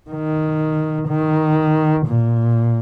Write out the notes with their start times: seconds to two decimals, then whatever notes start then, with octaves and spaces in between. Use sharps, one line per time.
0.11 D#3
1.08 D#3
2.06 A#2